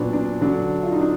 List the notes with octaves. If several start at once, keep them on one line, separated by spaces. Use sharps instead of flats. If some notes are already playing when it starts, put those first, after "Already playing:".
Already playing: A#2 F#3 B3 D4
D4
D3 F#3 D4
F4
D#4
D4